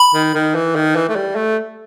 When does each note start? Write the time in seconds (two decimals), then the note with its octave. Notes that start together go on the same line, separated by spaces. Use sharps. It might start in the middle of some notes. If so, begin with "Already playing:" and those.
Already playing: B5
0.14 D#3
0.35 D#3
0.55 E3
0.75 D#3
0.96 E3
1.09 A3
1.16 G3
1.35 A3